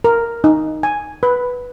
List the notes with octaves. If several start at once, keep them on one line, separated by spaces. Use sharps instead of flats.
A#4
D#4
G#5
B4